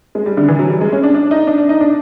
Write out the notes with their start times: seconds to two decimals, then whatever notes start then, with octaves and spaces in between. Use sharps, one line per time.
0.15 G#3
0.26 G3
0.37 D3
0.48 E3
0.59 F#3
0.70 G3
0.81 G#3
0.92 C#4
1.03 D4
1.14 D4
1.31 D#4
1.47 D4
1.58 D4
1.69 D#4
1.81 D4